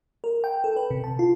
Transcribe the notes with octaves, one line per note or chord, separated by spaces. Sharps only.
A#4
G5
A4
B4
C3
A5
F4